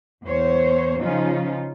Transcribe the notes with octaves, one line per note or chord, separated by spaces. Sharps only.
E2 C5 C#5
C#3 F3 C#4 D#4 F4